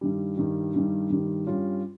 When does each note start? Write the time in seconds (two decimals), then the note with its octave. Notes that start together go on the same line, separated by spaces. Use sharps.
0.01 G2 D#3 G3
0.37 G2 D#3 G3
0.74 G2 D#3 G3
1.10 G2 D#3 G3
1.46 G2 G3 C#4 F4